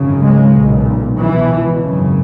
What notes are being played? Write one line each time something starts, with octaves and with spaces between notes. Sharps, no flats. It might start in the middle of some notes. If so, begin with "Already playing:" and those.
Already playing: G#1 F#2 C#3
G#3
B1 A#2
C#2 B2 E3
G#1 F#2 C#3